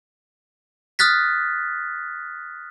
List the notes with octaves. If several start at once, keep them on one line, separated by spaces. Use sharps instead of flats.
D#6 F6 F#6 A6 B6